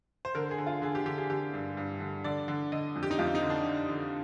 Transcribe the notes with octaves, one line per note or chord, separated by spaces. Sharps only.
C5
D3 A#4
G#4
D3
F4
D3 G#4
G4
D3 G4
G#4
D3 G4
G2
G2
D3
D3 D5
D3
D3 D#5
F2
G4
D#4
F2 F4
D#4
D3
D4
D3
D3